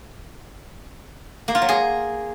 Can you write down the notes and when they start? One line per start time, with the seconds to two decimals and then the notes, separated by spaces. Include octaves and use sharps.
1.48 A#3
1.55 F4
1.62 F#3
1.69 G#4